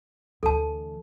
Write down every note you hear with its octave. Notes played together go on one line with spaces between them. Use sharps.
D2 E3 A4 A5